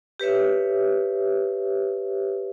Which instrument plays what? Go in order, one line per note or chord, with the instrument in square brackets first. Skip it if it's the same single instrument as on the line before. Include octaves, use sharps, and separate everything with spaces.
[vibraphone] G4 B4 C#5 E5